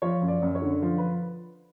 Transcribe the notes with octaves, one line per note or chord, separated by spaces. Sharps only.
F3 C#5
F#2
D5
F#2
C#5
D3
F3
B4